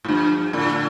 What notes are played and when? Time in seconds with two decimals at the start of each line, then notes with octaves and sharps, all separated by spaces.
0.04 A2
0.08 G2 F3
0.53 A2 D3